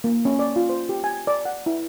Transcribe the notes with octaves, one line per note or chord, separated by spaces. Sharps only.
A#3
C#4
D5
F4
C5
G4
G#5
D5
F#5
E4